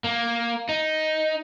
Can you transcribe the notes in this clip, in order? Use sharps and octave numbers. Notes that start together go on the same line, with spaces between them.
A#3
D#4